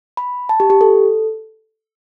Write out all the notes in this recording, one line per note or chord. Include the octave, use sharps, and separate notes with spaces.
B5
A5
G4
G4
A4